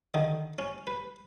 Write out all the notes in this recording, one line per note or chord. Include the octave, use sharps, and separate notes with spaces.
D3 D#3 D#5
C#4
B4